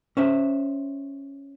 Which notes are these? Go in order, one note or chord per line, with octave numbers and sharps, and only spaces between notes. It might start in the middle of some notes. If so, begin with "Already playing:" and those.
C#4 C5 E5